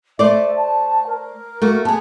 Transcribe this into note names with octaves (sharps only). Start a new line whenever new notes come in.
A3 C5 D5 E5
A5
A#4
A3 A#3 F#4
B3 G#4 A5